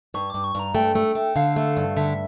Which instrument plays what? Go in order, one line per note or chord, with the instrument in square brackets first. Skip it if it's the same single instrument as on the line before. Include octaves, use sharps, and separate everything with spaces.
[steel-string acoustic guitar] G2 [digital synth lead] C#6
[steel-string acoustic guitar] G2 [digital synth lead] D6
[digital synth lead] C#6
[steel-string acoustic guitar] G2 [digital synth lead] A#5
[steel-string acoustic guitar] A3 [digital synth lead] G5
[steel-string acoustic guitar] A3
A3
[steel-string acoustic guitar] D3 [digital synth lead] F5
[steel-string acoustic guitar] A3
G2
[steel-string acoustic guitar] D3 [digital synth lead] E5